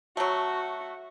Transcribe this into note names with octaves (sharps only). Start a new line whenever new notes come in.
F#3 A3 F#4